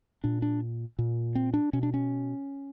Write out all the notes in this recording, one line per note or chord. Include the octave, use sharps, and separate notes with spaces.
A#2 D4
D4
A#2
C4
D4
B2 C#4
D4
C#4